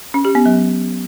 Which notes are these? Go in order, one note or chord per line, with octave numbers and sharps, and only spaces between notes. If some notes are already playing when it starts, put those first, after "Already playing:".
C#4
G4
B3
F#3